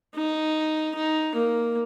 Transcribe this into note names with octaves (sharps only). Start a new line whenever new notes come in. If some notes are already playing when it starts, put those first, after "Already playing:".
D#4
D#4
A#3